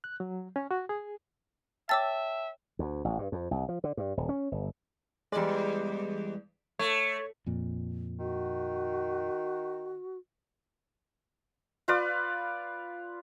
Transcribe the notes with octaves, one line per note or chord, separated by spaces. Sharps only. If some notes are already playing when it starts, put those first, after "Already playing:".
F#6
F#3
C#4
F#4
G#4
C#5 E5 G5 A5 D6 E6 A6
D2
A1
G2
F2
C2
F3
D3
G2
D#1
C#4
G1
E2 G3 G#3 D5
A3 C#5
F2 A#2
D#3 F#4
F4 B4 D5